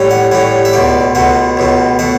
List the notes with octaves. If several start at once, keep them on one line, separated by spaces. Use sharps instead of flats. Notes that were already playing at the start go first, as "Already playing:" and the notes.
Already playing: A2 G3 C#4
F#5
A2 G3 C#4 F#5
E5
C#2 B2 A3 D5
C#2 B2 A3 F#5
C#2 B2 A3
B2 A3 F#5